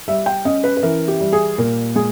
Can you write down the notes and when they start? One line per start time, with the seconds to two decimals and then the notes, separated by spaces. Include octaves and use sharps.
0.08 G3 E5
0.26 G5
0.45 C#4 D#5
0.64 B4
0.77 B4
0.83 E3 A#4
1.08 G4
1.21 G3
1.33 G#4
1.58 A#2 A#4
1.95 G#3 G#4